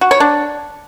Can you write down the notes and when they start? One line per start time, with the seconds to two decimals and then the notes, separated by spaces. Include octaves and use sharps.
0.01 F#4
0.11 C#5
0.20 D4